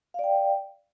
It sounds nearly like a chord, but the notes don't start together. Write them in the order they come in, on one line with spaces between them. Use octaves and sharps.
F5 D5 G5